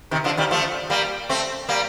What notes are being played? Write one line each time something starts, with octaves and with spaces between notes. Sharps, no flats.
C3 D#3
D3 F3
D#3 G3
F3 A3
G3 A#3
A3 C4
G3 A#3